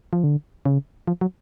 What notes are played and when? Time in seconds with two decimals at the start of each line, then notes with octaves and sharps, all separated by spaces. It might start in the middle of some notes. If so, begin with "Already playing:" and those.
0.13 F3
0.24 D3
0.65 C#3
1.07 F3
1.21 F#3